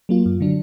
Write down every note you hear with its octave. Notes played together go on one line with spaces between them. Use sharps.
F#3 A#3 F4
F#2
D3 F#3 D4